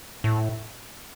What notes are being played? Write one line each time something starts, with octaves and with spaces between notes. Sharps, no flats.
A2